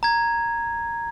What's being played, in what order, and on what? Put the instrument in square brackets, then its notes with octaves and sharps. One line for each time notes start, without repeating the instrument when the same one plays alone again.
[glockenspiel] A#5 G#6